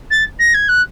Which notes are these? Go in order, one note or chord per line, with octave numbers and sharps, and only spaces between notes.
A6
A#6
G#6
F#6